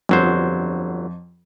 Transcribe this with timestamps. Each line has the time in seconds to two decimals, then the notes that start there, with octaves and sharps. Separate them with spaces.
0.09 G1 F2 F#3 C5